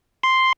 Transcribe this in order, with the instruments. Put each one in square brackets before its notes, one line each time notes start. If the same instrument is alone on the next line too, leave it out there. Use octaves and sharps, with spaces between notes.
[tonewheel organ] C6